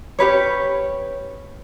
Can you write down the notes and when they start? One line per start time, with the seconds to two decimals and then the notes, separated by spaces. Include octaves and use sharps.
0.19 C#4 G4 B4 C#5